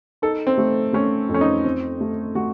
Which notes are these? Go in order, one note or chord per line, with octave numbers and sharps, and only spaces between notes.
D#4 A4
C4
A3
A3 C#4
F2
C#4
D#4
C4
A3
A3 F#4